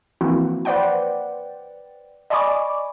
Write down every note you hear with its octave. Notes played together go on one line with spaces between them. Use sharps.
E3 F3 A#3 C4 E4 F#4
B4 C5 D5 F#5 G5
D5 D#5 G#5 B5 C#6 D6